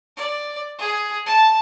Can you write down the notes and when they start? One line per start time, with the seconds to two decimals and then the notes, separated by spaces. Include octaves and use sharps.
0.16 D5
0.79 G#4
1.26 A5